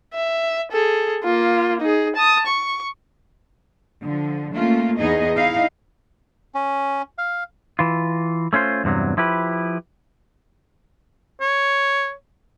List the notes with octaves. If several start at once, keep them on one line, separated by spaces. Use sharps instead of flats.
E5
G#4 A4
A#3 F4
D#4 G#4
A5 D#6
C#6
D3 F3
A3 A#3 C#4 F4
E2 B3 D#4 G#4 D#5
D#4 E4 F5
C#4
F5
E3 F4
A3 C#4 F4 C5
E2 G2 C3 F#3
F3 E4 G4 B4
C#5